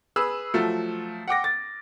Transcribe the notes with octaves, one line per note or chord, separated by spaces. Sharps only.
G#4 B4 E6
F3 F#3 A3
F#5 G5 D6 A#6
A6